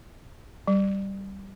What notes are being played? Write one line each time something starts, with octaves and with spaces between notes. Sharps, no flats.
G3